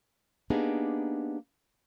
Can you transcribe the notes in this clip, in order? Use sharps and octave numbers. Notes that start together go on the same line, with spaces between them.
A#3 B3 D4 D#4 G4 G#4